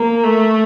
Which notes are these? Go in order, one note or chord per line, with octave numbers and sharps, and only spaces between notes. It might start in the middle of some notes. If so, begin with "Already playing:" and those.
Already playing: A#3
A3